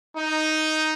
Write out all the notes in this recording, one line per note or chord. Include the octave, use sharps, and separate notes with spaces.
D#4